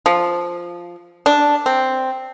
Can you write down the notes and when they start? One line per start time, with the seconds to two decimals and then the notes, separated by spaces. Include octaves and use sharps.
0.06 F3
1.26 D4
1.66 C4